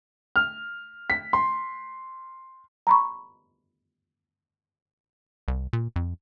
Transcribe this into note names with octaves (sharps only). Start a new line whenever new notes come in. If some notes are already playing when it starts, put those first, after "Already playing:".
F6
B6
C6
A#5 B5 C#6
C2
A#2
F2